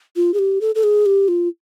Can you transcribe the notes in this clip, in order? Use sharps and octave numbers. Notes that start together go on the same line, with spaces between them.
F4
G#4
G4
A4
A4
G#4
G4
F4